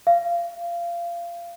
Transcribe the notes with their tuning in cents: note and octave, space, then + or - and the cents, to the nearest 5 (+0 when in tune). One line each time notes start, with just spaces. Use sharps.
F5 -20